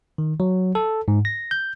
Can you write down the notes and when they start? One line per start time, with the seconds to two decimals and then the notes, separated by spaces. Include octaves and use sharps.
0.18 D#3
0.40 F#3
0.75 A4
1.08 G#2
1.25 A#6
1.51 G6